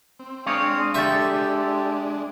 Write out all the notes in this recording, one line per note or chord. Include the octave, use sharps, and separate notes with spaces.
C4
G#3 C4 D4 C#5 F5 D#6
G4 A4 C5 E5